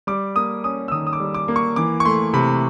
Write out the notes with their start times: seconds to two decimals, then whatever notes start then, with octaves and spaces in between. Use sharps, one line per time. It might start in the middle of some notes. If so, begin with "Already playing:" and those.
0.07 G3 D6
0.36 A#3 D#6
0.64 C#4 D#6
0.88 E6
0.92 D#3 D#6
1.07 D#6
1.13 D6
1.20 G3
1.34 D6
1.48 A#3
1.56 C#6
1.76 E3 D6
2.00 C#6
2.05 A3 C6
2.33 C3 B5